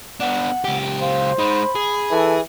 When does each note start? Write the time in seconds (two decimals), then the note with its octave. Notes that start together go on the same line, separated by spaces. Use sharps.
0.20 B3 D4 F#5
0.64 C#2 G4
1.01 C5 F5
1.38 G#3 D#4 B5
1.75 G#4
2.11 E3 A4